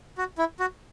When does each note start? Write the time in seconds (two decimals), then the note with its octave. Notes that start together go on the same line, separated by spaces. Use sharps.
0.18 F#4
0.38 E4
0.60 F#4